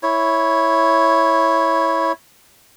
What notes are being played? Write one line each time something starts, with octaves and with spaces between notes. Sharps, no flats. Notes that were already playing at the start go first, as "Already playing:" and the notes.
E4 C#5